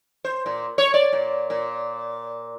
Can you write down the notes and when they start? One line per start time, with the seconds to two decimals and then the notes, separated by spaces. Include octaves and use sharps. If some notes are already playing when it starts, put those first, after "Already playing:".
0.24 C5
0.46 A#2
0.78 C#5
0.94 D5
1.13 A#2
1.50 A#2